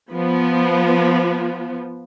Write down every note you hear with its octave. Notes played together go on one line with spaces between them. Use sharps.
F3 B3